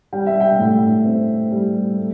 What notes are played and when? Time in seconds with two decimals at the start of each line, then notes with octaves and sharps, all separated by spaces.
0.13 G3 G5
0.27 E5
0.40 G5
0.59 A2
1.05 C4
1.51 G3
1.97 A3